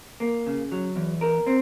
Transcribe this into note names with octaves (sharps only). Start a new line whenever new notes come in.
A#3
C#3
F#3
E2
A#4
C4